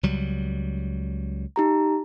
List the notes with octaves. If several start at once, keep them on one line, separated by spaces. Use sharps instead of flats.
C#2 F#3 G3
D#4 G4 A#5